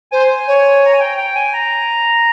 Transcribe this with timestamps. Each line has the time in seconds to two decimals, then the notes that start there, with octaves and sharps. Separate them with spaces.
0.12 C5 G#5
0.47 C#5
0.86 A#5
0.93 G#5
1.00 G5
1.18 G5
1.35 G#5
1.54 A#5